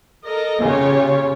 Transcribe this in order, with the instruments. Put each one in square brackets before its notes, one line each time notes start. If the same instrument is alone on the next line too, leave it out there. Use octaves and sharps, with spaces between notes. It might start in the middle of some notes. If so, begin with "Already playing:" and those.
[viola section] A4 A#4 D#5
[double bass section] C#3 [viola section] F4 G4 C#5